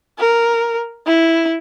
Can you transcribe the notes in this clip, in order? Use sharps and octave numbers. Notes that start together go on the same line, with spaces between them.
A#4
E4